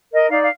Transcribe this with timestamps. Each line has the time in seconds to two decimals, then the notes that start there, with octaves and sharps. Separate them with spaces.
0.11 A#4 D#5
0.29 D#4 D5 F5
0.42 F5